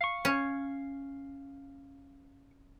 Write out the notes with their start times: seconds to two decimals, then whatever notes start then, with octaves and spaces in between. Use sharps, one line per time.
0.01 F5 C#6
0.25 C#4